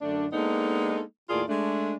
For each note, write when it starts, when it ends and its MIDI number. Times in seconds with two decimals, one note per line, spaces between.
0.01 0.27 42
0.01 0.27 50
0.01 0.27 57
0.01 0.27 62
0.32 1.00 56
0.32 1.00 58
0.32 1.00 59
0.32 1.00 62
0.32 1.00 63
0.32 1.00 69
1.30 1.42 39
1.30 1.42 45
1.30 1.42 65
1.30 1.42 68
1.30 1.42 70
1.30 1.42 74
1.49 1.95 56
1.49 1.95 57
1.49 1.95 62